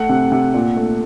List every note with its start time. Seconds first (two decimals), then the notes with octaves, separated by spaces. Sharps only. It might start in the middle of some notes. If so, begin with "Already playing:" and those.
Already playing: A3 F#5
0.09 C3
0.32 C3
0.54 A#2
0.77 A3